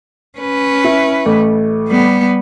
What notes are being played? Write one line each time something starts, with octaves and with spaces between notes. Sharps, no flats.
C#4 B4
E4
A1 A3
G3 B3